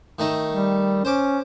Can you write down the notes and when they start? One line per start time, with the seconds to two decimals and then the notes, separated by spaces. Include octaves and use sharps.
0.19 D#3 A3 D#4
0.51 G3
1.05 C#4 C5 D6